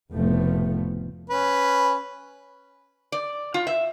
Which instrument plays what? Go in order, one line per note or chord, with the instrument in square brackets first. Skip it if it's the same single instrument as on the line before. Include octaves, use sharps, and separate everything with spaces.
[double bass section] F1 A2 C#3 F3 A3 B3
[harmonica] C#4 B4
[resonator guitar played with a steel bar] D5
F4
E5